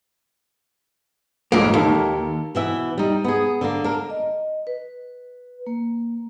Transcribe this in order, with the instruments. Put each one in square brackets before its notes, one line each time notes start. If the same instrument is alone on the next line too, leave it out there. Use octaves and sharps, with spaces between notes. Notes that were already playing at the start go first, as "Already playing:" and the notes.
[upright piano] A1 G#2 [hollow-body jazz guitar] F2 A#3
[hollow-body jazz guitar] D#2 [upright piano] D#3 A#3 A4
[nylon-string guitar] B2 E3 E5
G3 D#4
B3 G#4
D3 A#3
D4 A#4
[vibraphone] D#5
B4
A#3